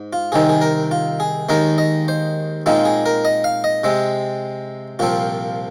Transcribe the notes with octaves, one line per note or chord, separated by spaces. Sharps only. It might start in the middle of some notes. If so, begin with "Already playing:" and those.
Already playing: G#2
F4
C2 C3 D#3 C4 D#4 G#4
G#4
A#4
F4
G#4
D#2 D#3 G#3 D#4 A#4
D#5
C5
A#2 G#3 C4 D#4 F4
G#4
A#4
D#5
F5
D#5
C3 G#3 C4
C2 A#2 F3 C4 F4